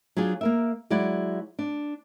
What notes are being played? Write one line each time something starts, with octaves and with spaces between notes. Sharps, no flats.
F#3 D4 F4 G#4
A#3 A#4 E5
F#3 G#3 E4 D5 F#5
D4